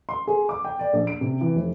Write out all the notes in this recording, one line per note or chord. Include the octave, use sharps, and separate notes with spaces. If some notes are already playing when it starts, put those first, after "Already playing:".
C6
G#4
D6
G5
D5
A#1
D7
C3
E3
F1